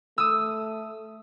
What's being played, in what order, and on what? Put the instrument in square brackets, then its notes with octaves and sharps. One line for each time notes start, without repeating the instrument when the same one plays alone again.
[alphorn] A3 [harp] D#6 E6